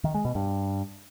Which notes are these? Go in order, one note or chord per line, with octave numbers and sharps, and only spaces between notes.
D#3
G#3
B2
G2